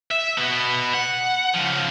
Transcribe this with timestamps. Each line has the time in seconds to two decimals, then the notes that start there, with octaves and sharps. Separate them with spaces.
0.11 E5
0.38 B2 B3
0.94 F#5
1.55 C#3 F3